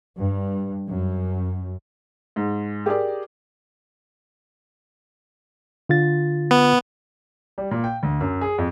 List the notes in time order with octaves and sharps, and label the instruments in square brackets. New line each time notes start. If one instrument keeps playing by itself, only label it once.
[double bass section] G2
F#2
[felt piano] G#2
G4 G#4 A#4 D5
[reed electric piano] D3 F4 A6
[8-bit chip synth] B3
[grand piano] G3
A#2
G5
D2
F#2
G#4
F2